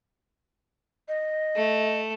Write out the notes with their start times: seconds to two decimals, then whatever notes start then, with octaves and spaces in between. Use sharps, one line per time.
1.08 D#5
1.56 A3